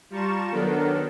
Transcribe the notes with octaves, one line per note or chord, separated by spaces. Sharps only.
G3 F4 A5 A#5 C#6 E7
D#3 F#3 B3 D4 A4 A#4